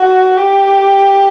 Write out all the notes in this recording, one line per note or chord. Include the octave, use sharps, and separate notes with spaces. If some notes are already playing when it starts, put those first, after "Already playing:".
Already playing: F#4
G4